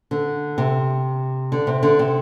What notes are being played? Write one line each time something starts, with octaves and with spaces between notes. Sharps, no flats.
D3
C3
D3
C3
D3
C3